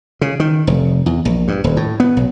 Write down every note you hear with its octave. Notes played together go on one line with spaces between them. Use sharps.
C#3
D#3
F1
E2
A#1
G2
D#1
A2
B3
B1